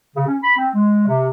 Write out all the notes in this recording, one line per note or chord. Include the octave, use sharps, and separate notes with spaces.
C#3
C#4
B5
C4
G#3
C3